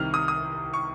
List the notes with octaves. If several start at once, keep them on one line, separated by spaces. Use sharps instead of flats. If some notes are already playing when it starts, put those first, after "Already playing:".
Already playing: C2 C3 D#3 F6
D#6
D#6
C#6